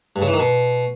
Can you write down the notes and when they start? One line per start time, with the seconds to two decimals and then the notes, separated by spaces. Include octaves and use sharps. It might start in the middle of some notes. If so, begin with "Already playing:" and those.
0.16 G2
0.22 C#3
0.28 E3
0.34 D#3
0.39 B2